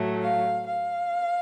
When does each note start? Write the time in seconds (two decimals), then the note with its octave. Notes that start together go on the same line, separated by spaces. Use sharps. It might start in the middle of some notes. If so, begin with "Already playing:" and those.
Already playing: A2 F#3 A3
0.22 F5
0.67 F5